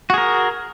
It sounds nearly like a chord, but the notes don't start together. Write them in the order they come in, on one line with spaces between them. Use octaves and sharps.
F#4 G#4 A#4